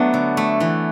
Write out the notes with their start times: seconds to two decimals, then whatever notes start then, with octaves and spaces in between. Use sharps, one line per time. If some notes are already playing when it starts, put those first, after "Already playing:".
Already playing: F#3 A3 B3 D4
0.14 D3
0.37 A3
0.60 E3